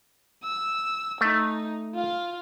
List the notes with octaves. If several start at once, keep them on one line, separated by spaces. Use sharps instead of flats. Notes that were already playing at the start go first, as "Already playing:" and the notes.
E6
A3 D#4
F4 F5